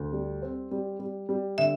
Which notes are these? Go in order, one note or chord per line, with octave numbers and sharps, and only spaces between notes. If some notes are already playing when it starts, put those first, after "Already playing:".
Already playing: D2
G3
C4
G3
G3
G3
D3 E5